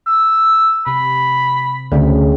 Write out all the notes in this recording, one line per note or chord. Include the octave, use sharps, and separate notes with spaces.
E6
C3 B5
D2 C#3 C4